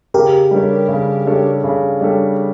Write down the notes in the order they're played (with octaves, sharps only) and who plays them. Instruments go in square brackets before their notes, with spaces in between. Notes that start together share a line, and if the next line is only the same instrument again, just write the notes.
[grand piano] C#3 [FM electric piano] G4 A#4
[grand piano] G3 D4 A4 C#5
C#3
G3 D4 A4 C#5
C#3
G3 D4 A4 C#5